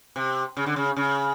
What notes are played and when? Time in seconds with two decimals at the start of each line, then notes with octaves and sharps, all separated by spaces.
0.16 C3
0.57 C#3
0.66 D3
0.76 C#3
0.97 C#3